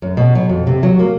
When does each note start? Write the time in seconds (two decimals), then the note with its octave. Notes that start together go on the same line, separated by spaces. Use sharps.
0.02 F#2
0.17 B2
0.35 F#3
0.49 F2
0.67 C3
0.83 F#3
0.99 A#3